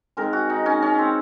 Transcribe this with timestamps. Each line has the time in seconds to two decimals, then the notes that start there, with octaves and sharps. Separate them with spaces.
0.17 D#3 G#3 C4 A#4
0.33 F#4
0.49 D#4
0.66 C#4
0.82 C#4
0.99 C4